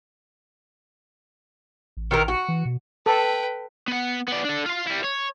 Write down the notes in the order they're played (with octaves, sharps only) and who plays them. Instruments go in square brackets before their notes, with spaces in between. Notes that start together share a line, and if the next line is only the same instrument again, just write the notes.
[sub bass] A1
[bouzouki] D#3 E3 A#4
F#4
[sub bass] E3
B2
[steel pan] A4 [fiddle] B4 G5
[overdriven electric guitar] B3 F#5
B3 D5
D4 A4
F4 F5
G3 E4
C#5